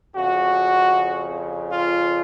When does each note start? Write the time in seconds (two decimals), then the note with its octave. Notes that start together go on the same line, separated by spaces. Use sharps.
0.15 F2 C#3 F#4
1.71 F4